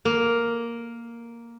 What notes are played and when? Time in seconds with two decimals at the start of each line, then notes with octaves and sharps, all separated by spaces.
0.05 A#3